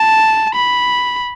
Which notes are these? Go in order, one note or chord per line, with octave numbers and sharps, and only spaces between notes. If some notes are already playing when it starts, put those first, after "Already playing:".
Already playing: A5
B5